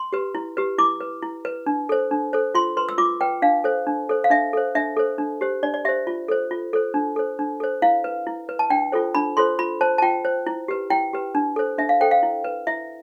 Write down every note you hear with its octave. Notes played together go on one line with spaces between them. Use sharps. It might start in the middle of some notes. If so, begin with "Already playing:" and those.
Already playing: C6
G4 B4
E4
G4 B4
E4 D6
B4
E4
B4
D4
A4 C5
D4
A4 C5
F4 C6
B4 C6
E6
F4 D6
B4 G5
D4 F5
A4 C5
D4
A4 C5
F5
D4 E5
A4 C5
D4 E5
A4 C5
D4
G4 C5
D4 D5
D5
G4 C5 E5
F4
A4 C5
F4
A4 C5
D4
A4 C5
D4
A4 C5
E4 F5
B4
E4
B4
A5
D4 G5
F4 A4 C5
D4 B5
F4 A4 C5 C6
F4 B5
C5 A5
A5
F4 G5
C5
E4
G4 B4
E4 G5
G4 B4
D4
A4 C5
D4 E5
F5
A4 C5 G5
F5
E4
B4
E4 E5